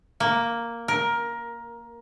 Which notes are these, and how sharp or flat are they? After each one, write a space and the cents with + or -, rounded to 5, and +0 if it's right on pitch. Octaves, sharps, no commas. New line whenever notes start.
A#3 +0
A#4 +15